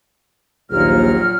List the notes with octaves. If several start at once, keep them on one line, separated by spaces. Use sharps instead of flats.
A#1 D#2 A#2 F#3 F6